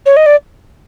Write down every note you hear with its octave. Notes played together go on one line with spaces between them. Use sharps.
C#5
D#5
D5